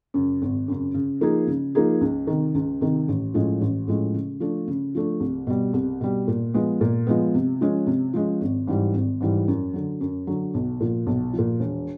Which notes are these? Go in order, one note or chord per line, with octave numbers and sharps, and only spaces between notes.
F#2 C#3
G#1
F#2 C#3
C#3
F3 A#3 D#4 G#4
C#3
F3 A#3 D#4 G#4
C#2
C3 D#3
C#2
C3 D#3
A1
A2 F3 G#3 C#4
A1
A2 F3 G#3 C#4
C#3
F3 A3 D4
C#3
F3 A3 D4
C2
B2 G3
C2
B2 G3
A#2
F3 G#3 B3
A#2
F3 G#3 B3
C3
F3 G#3 C#4
C3
F3 G#3 C#4
G#1
G#2 E3 G3
G#1
G#2 E3 G3
F#2
D3 F#3
F#2
D3 F#3
B1
A#2 F3
B1
F3
A#2
E1